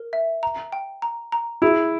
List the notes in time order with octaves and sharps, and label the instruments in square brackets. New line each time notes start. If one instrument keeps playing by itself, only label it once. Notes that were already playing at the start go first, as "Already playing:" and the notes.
Already playing: [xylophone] A#4
E5
A#5
G5
A#5
A#5
[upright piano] E4 [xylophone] G#4